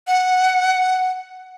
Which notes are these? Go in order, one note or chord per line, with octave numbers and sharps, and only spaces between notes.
F#5